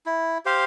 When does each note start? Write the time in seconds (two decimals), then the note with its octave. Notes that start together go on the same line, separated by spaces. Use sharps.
0.06 E4
0.45 G4 C5 F5